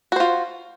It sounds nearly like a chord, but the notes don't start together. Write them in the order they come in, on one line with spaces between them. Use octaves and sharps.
F#4 C5 F4